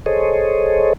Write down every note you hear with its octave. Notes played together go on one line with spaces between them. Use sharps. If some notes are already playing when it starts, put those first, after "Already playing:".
G#4 A4 C5 C#5 D#5